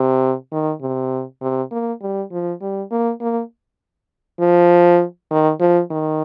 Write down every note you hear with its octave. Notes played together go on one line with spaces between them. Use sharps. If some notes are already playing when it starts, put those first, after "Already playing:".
Already playing: C3
D#3
C3
C3
A#3
G3
F3
G3
A#3
A#3
F3
D#3
F3
D#3